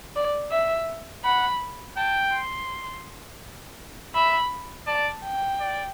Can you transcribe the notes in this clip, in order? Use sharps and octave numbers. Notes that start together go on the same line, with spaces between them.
D5
E5
F#5 B5
G5 A5
C6
E5 B5
D5 A5
G5
D5